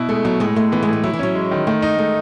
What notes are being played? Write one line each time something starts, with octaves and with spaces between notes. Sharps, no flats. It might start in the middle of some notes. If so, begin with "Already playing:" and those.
Already playing: B2 E4
G#3 A3
B2 F#3
A2 G#3
G#3 A3
E3 B3
G#3
A2
G#3
F#3 E4
E3
F#3 C#4
G#3
D#3
D#3 A3
D#4
G#3 A3